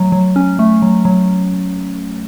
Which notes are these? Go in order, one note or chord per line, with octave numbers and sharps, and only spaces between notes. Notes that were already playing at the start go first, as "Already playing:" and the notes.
Already playing: F#3 A3
F#3
C#4
A3
F#3
F#3